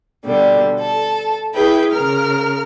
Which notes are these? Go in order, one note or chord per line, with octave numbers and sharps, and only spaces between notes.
B2 D3 G3
A4
E4 G#4 B4 G5
C#3 A#4 F6